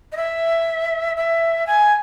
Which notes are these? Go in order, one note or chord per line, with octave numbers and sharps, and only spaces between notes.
D#5
E5
E5
G#5